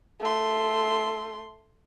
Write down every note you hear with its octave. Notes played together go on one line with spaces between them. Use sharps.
A3 C6